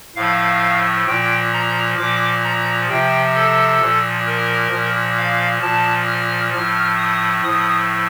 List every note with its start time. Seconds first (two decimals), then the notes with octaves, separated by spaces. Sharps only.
0.16 A2 F3 F5
1.07 A#2 F3 G5
1.53 A#5
1.98 A#2 F3 D6
2.44 A#5
2.89 C3 F3 G5
3.35 A4
3.80 A#2 F3
4.26 A#4
4.72 A#2 F3
5.17 F5
5.62 A#2 F3 A5
6.08 F6
6.53 A2 F3 F6
6.98 D#6
7.44 A2 F3 D#6